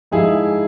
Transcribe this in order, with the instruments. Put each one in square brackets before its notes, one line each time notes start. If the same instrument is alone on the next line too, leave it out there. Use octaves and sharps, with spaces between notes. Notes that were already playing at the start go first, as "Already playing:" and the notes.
[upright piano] G#2 F3 G#3 E4 G#4